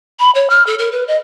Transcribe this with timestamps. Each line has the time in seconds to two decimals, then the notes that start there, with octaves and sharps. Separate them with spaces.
0.20 B5
0.35 C#5
0.50 F6
0.67 A4
0.79 A#4
0.92 B4
1.08 D#5